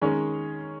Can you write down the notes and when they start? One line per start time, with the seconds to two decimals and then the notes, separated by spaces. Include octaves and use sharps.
0.01 D#3 G#3 C#4 G#4 C#5